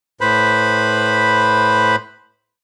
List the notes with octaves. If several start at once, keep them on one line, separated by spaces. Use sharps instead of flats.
A2 B4 C5 B5